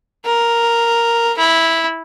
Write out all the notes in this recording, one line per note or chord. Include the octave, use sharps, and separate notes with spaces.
A#4
E4